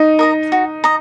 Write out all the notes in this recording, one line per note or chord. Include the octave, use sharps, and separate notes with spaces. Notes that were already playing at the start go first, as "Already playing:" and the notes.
Already playing: D#4
A#4 D#5 A#5
F#4
D#5 A#5